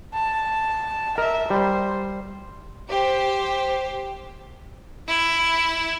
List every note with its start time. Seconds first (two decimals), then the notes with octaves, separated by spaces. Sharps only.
0.14 A5
1.18 A#4 E5
1.50 G3 C5
2.90 G4 C5
5.07 E4